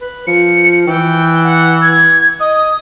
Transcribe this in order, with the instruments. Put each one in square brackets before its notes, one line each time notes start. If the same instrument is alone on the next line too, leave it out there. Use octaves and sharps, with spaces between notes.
[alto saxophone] B4
[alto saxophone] F3 [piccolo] C#7
[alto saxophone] E3 [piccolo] G5
[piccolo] F#5
G#6
[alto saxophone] D#5 [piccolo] D#6